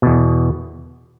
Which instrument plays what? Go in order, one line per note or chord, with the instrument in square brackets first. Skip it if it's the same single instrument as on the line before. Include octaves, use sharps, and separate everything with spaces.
[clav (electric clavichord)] E2 B2